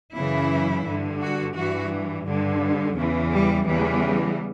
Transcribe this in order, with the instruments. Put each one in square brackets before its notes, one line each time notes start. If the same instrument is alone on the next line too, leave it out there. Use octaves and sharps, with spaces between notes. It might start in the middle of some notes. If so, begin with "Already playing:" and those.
[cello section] F#2 C#3 E3 E4
G2 D3
F#4
G2 E3 F#4
G2 D3
E2 C#3 E3
G3
E2 C#3 E3 G3